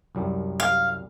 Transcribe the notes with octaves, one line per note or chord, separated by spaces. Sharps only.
C2 F#2 G3
F5